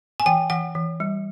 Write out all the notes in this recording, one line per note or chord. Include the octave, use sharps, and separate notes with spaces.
G#5
E3 G5
E3 F#5
E3
G3